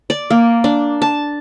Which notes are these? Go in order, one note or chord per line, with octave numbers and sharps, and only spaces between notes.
D5
A#3
D4
A5